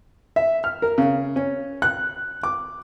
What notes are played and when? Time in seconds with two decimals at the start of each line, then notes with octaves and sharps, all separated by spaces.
0.36 E5
0.64 F6
0.82 A#4
0.98 C#3
1.36 C#4
1.82 F#6
2.43 D6